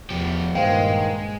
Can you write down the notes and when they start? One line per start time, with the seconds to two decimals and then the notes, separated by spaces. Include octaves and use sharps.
0.10 E2 F3 G4
0.55 G2 A#2 D#3 G#3 C5 F5 G5